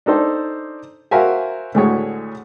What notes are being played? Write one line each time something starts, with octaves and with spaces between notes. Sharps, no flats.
D4 D#4 A4 C5
F#4 A#4 C5 E5 F5 G#5
D2 A2 G#3 F#4 G#4 C#5